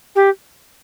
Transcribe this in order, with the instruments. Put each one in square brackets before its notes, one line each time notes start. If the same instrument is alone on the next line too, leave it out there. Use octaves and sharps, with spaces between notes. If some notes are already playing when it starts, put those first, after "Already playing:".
[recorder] G4